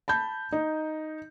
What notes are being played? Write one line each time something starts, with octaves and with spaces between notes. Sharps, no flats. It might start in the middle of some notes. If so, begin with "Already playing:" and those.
A5 B5 G6
D#4